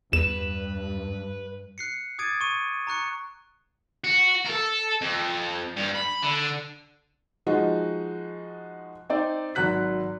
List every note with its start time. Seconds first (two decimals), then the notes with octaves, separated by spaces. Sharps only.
0.13 E2 G2 B4 E7
1.78 F#6 C7 C#7
2.19 D6 D#6 G#6 A6 D7 D#7
2.41 C#6 C#7 D#7
2.87 A#5 C#6 F#6 C#7
4.04 F#4
4.45 A4 A#4
5.01 F2
5.76 G2
5.95 B5
6.22 D3
7.46 F3 G#3 D#4 F#4
9.10 C4 D#4 D5
9.55 G#1 F#3 F#6 B6